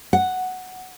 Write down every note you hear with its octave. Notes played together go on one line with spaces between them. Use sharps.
F#5